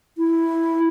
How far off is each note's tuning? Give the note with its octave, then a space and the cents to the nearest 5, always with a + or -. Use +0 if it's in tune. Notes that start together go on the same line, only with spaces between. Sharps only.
E4 -5